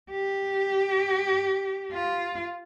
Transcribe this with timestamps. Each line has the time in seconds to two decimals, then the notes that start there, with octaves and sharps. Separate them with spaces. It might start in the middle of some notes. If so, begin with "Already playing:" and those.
0.11 G4
1.92 F4